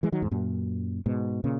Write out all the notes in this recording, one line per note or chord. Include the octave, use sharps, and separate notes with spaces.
E3 G#3
D#3 F#3
E2 G#2
F#2 A#2
G#2 B2
A#2 C#3